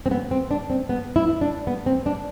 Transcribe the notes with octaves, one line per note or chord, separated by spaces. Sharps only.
C4
B3
C4
D4
C4
B3
E4
D4
B3
C4
D4